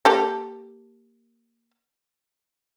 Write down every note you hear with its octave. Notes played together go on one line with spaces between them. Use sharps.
A#3 G4 A4